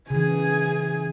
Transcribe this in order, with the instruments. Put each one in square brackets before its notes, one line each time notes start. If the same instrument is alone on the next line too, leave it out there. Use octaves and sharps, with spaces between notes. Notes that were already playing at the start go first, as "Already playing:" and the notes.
[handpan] C#3 E3 [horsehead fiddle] G#4 G#5